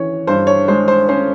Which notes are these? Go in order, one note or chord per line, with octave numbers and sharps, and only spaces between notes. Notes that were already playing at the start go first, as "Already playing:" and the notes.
Already playing: E3 C#4 C#5
G2 C5
C#5
G#3 C5
C5
C#4 C5